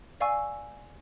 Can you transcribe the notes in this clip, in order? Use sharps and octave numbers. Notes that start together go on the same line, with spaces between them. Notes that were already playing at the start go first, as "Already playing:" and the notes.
D5 F5 G#5 C#6 E6